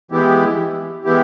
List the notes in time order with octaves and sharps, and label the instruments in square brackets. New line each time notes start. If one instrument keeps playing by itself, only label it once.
[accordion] E3 G#3 B3 E4 G4
E3 G#3 B3 E4 G4